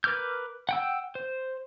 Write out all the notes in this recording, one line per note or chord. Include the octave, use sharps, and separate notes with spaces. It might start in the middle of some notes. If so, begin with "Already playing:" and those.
A#4 B4 D6 F6 G6
F#5 G5 E6
C5